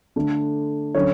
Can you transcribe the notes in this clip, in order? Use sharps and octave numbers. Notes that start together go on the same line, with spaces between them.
D3 A3 D4
D3 F#3 C#4 C#5